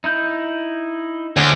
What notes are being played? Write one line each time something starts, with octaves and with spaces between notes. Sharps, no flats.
D#4 E4 G6
D2 C#5 G#5